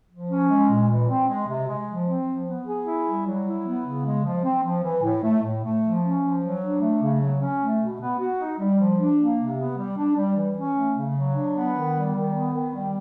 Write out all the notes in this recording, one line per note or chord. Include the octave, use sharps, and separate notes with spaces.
F3
C#4
G#3
A#2
E3
C4
G#3
C3
G#3
F3
C4
F3
B3
G#4
E4
G3
F#3
E4
B3
C#3
G#3
F3
C4
F3
E3
A2
A3
A2
A3
F3
C#4
F3
F#3
D4
A3
C#3
F#3
C#4
A3
B2
B3
F#4
D#4
G3
F3
D4
A#3
C3
B3
G3
D4
G3
E3
C#4
A3
C#3
F#3
D4
B3
D#3
G3
D#3
B3
D#3
G3